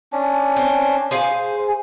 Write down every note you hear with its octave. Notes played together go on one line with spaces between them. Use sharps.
C#4 D4
C4
G#4 C5 F5 G#5